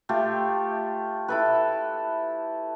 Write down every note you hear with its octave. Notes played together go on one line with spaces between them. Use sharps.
A3 F4 G4
E4 A4 B4